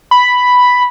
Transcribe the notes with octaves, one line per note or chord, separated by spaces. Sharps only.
B5